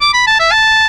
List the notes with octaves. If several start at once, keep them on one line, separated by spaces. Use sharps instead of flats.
D6
B5
A5
E5
A5